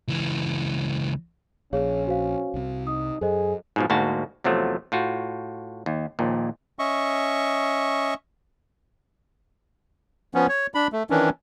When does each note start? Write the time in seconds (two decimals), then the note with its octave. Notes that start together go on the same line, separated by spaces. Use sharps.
0.08 C#2 E3
1.73 A#1 C#4 G#4 C#5 F5
2.07 F#4 C5 F5
2.54 C2 C3
2.87 D#4 D#6
3.21 F#2 G#4 A4 C5 D#5
3.76 G#2 B2 F3
3.90 D2 G#2 A#3 F#4 A5
4.44 E2 C3 F3 F#3 A3
4.92 A2 F4 F#4
5.86 D#2
6.19 A#1 D#2 A#2
6.79 C#4 D#5 E5 C#6
10.35 F3 B3 C#4
10.49 C#5
10.74 D4 B5
10.93 A3
11.10 D#3 E3 C#4 D4